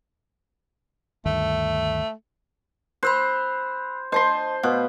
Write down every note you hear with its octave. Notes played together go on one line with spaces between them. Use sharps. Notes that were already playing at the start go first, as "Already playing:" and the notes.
D2 G2 D#3 A3
C5 B5 E6 F#6
C5 D#5 A5 C6
B2 F5